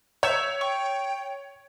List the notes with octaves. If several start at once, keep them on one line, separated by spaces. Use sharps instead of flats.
C#5 E5 E6 G6
G5 C#6